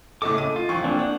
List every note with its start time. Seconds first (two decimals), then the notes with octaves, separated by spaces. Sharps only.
0.22 A2 C#3 A4 D#5 D6
0.38 D#7
0.56 F4
0.69 F1 E3 C#6
0.84 A#3 C4 D4
0.99 D4 F#5